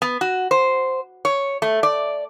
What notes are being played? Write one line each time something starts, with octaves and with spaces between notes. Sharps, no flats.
B3
F#4
C5
C#5
A3
D5